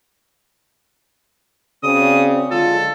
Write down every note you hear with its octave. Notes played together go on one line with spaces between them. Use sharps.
C#3 C4 F#4 D5 D#6
D3 F#3 G#3 F4 A4